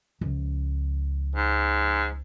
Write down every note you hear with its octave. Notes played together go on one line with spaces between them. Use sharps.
C#2 F3
G#2